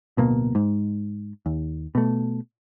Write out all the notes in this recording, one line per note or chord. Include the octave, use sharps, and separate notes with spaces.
D1 B2 A#3
G#2
D#2
B2 A3